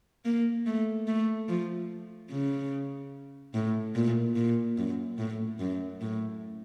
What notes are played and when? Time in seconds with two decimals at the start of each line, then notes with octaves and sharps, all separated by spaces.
0.25 A#3
0.66 A3
1.07 A3
1.49 F3
2.30 C#3
3.54 A2
3.95 A#2
4.36 A#2
4.77 F#2
5.18 A2
5.59 F#2
6.01 A2